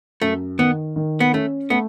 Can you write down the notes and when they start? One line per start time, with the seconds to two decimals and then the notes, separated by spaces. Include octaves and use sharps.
0.21 F#2 A3
0.59 D#3 B3
0.96 D#3
1.20 B3
1.33 A3 C#4
1.70 A3 B3